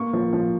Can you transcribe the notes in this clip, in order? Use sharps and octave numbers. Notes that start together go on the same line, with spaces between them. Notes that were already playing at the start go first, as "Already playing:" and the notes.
Already playing: A#3 C#6
F3
F3